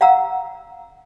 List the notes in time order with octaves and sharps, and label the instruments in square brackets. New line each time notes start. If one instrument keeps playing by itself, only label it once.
[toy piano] F5 F#5 A#5 E6